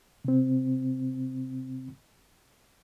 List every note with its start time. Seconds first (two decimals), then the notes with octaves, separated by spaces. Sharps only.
0.25 C3 C4